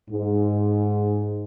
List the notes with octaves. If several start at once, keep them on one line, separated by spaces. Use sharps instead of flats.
G#2